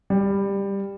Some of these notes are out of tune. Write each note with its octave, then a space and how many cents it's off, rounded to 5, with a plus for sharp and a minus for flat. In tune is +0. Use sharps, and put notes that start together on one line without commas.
G3 +15